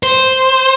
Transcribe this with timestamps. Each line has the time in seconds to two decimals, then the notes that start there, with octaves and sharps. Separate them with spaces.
0.03 C5